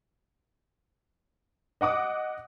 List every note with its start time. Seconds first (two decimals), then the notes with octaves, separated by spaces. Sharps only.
1.81 D#5 F#5 D6 D#6